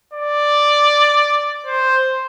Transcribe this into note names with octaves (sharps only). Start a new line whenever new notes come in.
D5
C5